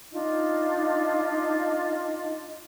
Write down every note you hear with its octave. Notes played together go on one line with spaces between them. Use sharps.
D4 D#4 F4 D#5